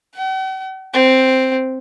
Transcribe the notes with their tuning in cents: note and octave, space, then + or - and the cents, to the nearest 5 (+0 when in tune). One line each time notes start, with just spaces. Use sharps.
F#5 +45
C4 +0